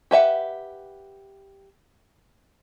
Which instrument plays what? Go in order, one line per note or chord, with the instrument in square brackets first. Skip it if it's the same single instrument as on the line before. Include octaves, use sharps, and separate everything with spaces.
[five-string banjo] G4 B4 E5 F#5